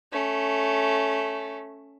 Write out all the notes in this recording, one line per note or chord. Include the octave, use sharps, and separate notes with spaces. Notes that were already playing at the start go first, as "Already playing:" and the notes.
A3 C#4